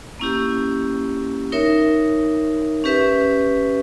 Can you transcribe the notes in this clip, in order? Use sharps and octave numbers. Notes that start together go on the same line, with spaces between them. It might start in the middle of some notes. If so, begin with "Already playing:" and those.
A#3 C#4 E4 G4
D#4 A#4 C#5 E5
C#4 G4 B4 E5